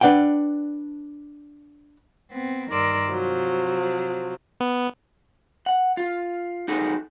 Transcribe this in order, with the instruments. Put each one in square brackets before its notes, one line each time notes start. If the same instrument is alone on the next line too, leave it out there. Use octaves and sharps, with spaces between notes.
[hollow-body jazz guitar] D4 B4 D5 F#5 G5
[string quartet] B3 C4
G2 D#3 A#4 D5 C6 E6
C3 F3 F#3
[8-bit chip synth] B3
[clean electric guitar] F#5
F4
D#4 F#4 G#4 A4